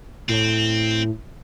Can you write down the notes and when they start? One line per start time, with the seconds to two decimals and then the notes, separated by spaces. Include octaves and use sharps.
0.29 A2 C4